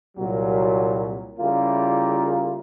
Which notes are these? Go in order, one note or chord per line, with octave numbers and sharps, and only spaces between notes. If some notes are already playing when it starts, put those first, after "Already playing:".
C2 A#2 F#3
C#3 G3 A#3 E4 F4